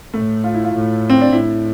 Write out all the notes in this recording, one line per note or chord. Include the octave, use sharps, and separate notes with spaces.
A2 A3
F4
E4
F4
A2
C4
D4
A2 E4